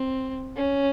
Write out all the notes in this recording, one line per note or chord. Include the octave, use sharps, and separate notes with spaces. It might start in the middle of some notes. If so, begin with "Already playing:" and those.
Already playing: C4
C#4